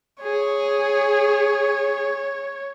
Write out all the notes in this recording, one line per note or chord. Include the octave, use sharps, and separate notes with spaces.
G#4 C#5